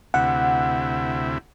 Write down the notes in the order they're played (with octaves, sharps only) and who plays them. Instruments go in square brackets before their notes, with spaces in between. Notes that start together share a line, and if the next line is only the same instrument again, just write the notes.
[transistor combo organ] D2 C3 E4 [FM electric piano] F#5